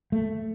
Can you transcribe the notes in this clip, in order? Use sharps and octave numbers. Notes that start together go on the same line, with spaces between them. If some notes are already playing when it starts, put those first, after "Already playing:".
A3